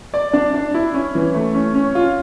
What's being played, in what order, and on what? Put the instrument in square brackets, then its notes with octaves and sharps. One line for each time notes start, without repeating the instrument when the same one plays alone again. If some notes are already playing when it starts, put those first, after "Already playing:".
[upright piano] D5
D4
D4
E4
C#4
E3
A3
C#4
C#4
F4